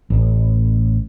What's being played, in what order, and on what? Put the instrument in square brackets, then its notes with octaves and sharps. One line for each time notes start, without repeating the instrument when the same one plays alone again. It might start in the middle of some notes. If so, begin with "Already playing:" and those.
[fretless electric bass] A1